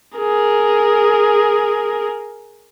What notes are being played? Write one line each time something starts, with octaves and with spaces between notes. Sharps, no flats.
G#4 A#4